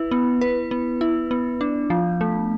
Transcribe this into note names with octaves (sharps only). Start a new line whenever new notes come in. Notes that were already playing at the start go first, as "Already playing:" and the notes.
Already playing: E4 B4
B3
B4
B3
E4
B3
D4
F3
A3